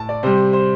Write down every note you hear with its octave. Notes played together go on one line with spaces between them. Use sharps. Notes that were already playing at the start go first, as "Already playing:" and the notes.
Already playing: A2 A5
D5
C3 G3 C5
C5